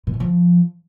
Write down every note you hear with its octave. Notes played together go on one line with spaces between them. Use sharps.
A#2
B2
F3